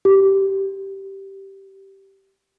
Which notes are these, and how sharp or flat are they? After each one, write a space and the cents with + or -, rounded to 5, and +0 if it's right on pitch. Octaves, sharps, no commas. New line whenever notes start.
G4 -10